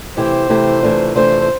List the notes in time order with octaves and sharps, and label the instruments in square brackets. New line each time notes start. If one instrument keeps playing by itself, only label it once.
[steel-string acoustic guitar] C3 E3 A3 E4 G4 [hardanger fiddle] C5
[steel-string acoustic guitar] C3 E3 A3 E4 G4
C3 E3 A3 D4 F4
[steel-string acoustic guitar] C3 E3 A3 D4 F4 [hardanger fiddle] C5